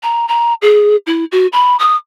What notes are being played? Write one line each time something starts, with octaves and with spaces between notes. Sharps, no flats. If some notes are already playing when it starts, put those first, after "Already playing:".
A#5
A#5
G#4
E4
F#4
B5
D#6